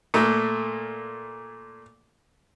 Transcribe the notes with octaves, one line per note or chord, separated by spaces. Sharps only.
A#2 A3 A#3